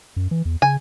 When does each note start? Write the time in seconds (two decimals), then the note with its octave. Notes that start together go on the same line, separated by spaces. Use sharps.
0.17 F#2
0.31 E3
0.45 E2
0.62 C#3 G#5